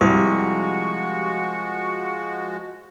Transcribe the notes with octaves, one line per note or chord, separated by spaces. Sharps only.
C2 F3 G#3 F#4 G4 C#6